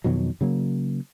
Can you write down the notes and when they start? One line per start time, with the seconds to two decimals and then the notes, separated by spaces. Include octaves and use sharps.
0.04 F2 B2 D#3 F#3
0.41 C#3 F#3 A#3